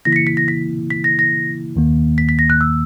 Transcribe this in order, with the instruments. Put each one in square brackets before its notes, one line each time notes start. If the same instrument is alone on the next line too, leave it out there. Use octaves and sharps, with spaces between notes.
[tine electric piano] C#3 E3 A#3 E4 [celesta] A#6
[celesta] B6
C#7
B6
A#6
B6
B6
A#6
A#6
[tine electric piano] D#2 D#3 A#3
[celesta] B6
B6
A#6
F#6
E6